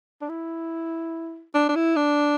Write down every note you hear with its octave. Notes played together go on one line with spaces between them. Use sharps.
D4
E4
D4
D4
E4
D4